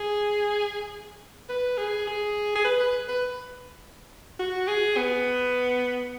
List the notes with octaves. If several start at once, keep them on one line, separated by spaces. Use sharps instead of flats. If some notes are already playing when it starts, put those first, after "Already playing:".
Already playing: G#4
B4
G#4
G#4
G#4
B4
B4
B4
F#4
G#4
B3